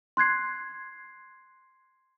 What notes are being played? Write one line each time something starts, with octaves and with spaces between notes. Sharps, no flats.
C6 F#6 G#6 C7